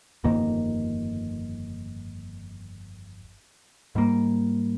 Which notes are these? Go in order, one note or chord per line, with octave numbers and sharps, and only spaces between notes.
G1 F2 D#3 A#3
G#2 G3 A#3